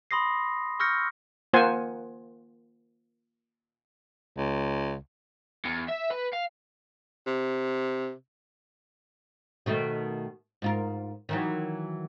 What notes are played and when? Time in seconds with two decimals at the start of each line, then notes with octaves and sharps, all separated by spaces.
0.11 B5 C6 D#6 A#6 C7
0.80 C#6 E6 F6 G6 A#6 C#7
1.53 A#3 F4 C5 F#5 G#5
4.37 C#2
5.65 E2
5.88 E5
6.10 B4
6.33 F5
7.27 C3
9.66 B2 D#3 A3
10.62 G#2 F4 A#4
11.29 D#3 E3 F#3